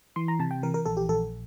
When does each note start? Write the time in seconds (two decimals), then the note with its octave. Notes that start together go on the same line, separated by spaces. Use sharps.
0.16 E3 C6
0.28 A#5
0.39 C3 A5
0.51 G5
0.63 E3 A#4
0.74 A#4
0.86 A#1 A4
0.97 G4
1.09 A#1 A4